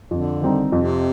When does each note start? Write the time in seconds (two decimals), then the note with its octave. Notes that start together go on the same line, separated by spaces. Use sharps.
0.11 F2 D3
0.42 D#3 G3 C4 D#4
0.72 F2 C3